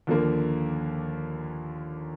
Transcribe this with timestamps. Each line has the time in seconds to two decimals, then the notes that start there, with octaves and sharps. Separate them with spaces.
0.07 D#2 D3 F3 A#3